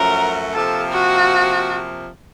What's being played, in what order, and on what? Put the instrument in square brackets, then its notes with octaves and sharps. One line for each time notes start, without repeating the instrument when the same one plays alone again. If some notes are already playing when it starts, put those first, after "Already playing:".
Already playing: [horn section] F#2 F3 A3 C#4 F#4 [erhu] A#4
[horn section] C3 F3 A#3 [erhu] A4
[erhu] F#4